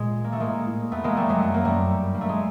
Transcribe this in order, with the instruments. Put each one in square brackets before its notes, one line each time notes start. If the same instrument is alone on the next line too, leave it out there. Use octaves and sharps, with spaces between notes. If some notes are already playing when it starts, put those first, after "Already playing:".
Already playing: [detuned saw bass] A#2 [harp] G#3
[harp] A#3
A3
[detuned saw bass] A2 [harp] G#3 A#3
[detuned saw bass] A#2
A2
A#2
[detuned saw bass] F2 [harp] A3 B3
[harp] G#3 A#3
[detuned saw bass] F2 [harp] G3 A3
[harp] F#3 G#3
[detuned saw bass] F#2 [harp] A3
[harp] A#3
[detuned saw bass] F#2 [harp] G3 A3
[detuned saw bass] G2
[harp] A#3
A3
G#3